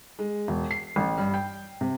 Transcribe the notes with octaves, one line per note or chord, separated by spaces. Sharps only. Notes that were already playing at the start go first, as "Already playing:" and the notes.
G#3
E1
C7
A1
G2
G5
C3